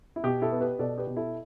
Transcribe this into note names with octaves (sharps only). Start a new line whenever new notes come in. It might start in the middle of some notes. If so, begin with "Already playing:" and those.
E4
B2 G4
E4 A4
B3
G4 B4
B2 A4 D5
G4 B4
B2
E4 A4